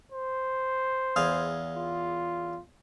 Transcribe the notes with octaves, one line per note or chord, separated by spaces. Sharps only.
C5
E2 G#4 F5
F4